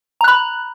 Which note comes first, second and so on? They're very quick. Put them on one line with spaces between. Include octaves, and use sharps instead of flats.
A#5 F#6 B5